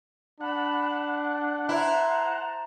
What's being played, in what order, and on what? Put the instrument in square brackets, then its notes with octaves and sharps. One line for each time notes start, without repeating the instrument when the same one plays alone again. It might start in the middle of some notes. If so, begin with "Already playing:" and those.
[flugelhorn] D4 [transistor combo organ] F#5 [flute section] A5 B5
[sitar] E4 [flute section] C5 A5 A#5